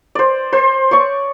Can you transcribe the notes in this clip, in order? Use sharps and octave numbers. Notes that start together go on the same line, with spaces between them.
C5 D5
C5
C#5 D5 C#6